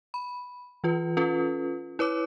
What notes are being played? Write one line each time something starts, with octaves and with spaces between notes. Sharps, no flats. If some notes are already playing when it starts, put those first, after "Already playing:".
B5
E3 F4 B4
C#4 F4 A4 B4
E4 B4 C#5 D6